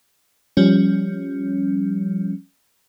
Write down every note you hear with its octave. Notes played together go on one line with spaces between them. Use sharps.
F3 G3 C#4